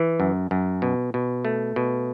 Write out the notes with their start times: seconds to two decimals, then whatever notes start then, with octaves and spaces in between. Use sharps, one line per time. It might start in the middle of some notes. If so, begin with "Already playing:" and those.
Already playing: E3
0.20 F#2
0.51 F#2
0.82 B2
1.14 B2
1.45 A3
1.76 B2